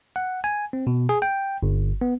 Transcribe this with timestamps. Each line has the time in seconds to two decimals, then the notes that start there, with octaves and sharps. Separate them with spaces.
0.16 F#5
0.44 G#5
0.73 C4
0.87 B2
1.09 G#4
1.22 G5
1.63 G1
2.01 B3